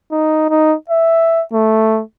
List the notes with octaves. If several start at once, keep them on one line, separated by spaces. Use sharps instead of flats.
D#4
D#4
E5
A3